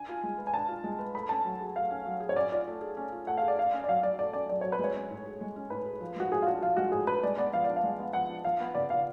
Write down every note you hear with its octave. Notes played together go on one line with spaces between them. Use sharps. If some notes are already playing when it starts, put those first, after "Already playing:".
Already playing: D4 G#5
F4
G#3
B4
G#5
D4 A5
F4
G#3
B4
A3 B5
C#4 A5
F#3
G#4
A3 F5
C#4
F#3
G#4
C#5
C#4 D5
F4 D5
A3
G#4
C#4
F4
A3 F#5
G#4 F5
D5
A3 F5
C#4
D5
F#3 F5
F#3 D5
A3 D5
C#4 D5
F#3 D5
F#3 C#5
B4
G#3 C#5
C#4
A2
G#4
G#3
C#4
A2 B4
G#4
F3
G#3 F#4
A2 G#4
F4
D4 F#4
F3 F4
G#3 F#4
A2 G#4
D4 B4
G#3 D5
B3 D5
F3 F5
D4 D5
F5
G#3
B3
F3 F#5
D4
F3 F5
B3
C#3 D5
F4 F5